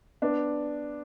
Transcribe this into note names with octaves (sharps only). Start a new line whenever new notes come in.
B3 D4